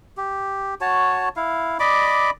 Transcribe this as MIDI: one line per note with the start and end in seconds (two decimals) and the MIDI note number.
0.17 0.74 67
0.81 1.29 66
0.81 1.29 73
0.81 1.29 81
1.36 1.78 64
1.36 1.78 77
1.80 2.30 74
1.80 2.30 75
1.80 2.30 83
1.80 2.30 86